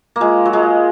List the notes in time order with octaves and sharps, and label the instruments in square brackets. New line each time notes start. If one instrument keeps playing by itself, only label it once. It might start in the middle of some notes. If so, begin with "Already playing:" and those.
[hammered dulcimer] A#3
[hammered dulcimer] G#3 [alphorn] F4
[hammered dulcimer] F#3
[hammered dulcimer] G#3 [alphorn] F4